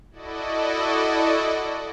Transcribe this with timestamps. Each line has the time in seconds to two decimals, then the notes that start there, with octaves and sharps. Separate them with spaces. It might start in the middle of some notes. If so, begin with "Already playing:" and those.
0.11 E4 F#4 A4 D5 D#5